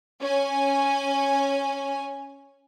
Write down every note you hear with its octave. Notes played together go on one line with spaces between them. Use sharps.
C#4 G#5